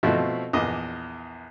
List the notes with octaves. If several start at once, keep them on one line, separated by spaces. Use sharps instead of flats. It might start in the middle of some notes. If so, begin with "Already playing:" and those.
B2 F3 A3 C4 E4 F#4
A#1 E2 D#5 D6